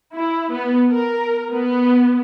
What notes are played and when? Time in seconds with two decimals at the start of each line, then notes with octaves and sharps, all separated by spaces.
0.13 E4
0.52 B3
0.90 A#4
1.51 B3